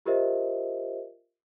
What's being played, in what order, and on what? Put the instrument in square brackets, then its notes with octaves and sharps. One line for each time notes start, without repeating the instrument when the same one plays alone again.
[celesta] F4 G4 A#4 C5 D#5 E5